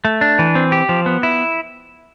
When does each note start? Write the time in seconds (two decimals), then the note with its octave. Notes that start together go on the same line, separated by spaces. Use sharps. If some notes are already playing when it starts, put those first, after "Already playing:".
0.05 A3
0.21 D4
0.39 E3
0.55 C4
0.72 G4
0.89 F3
1.06 B3
1.23 E4